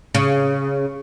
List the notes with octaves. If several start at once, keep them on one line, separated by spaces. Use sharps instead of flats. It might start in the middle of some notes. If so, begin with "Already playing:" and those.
C#3